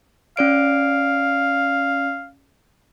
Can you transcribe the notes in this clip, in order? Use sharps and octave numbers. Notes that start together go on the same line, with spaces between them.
C#4 D5 F5 D7